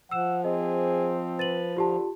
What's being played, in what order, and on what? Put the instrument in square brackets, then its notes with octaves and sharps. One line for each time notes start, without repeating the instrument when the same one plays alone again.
[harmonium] F3 [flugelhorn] F#5 [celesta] E6 E7
[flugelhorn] C4 [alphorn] G#4 [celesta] D#5
[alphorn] B4 [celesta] A6 D#7 F#7
[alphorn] D3 [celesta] F4 G4 A5